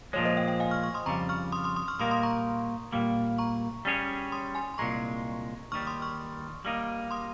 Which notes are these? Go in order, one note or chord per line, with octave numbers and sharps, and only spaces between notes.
A#2 F3 G#3 C#5
C5 D#5
D#5 G5
D#5 G5
F5 G#5
C#6 F6
C#6 F6
C6 D#6
F2 C#3 G3 A#5 C#6
C#6 F6
C6 D#6
C6 D#6
C6 D#6
C#6 F6
A#2 G3 A#3 D#4 A#4 C6 D#6
C6 D#6
A#5 C#6
A#2 G3 A#3
A#5 C#6
G3 C#4 G#4 C#5
C6 D#6
G#5 C6
C6
C2 A#2 G#3 A#5 C#6
D#2 D#3 G3 C#6 F6
C6 D#6
C#6 F6
G3 A#3 D#4
C6 D#6